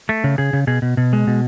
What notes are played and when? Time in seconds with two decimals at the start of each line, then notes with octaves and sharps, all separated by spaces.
0.09 A3
0.24 C#3
0.38 C#3 G#4
0.53 C#3
0.67 B2 G#4
0.82 B2
0.97 B2
1.13 G#3
1.27 B2